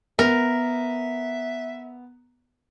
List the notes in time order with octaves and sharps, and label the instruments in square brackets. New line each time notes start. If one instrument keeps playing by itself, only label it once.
[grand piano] B3 [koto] A#4 [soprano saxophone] E5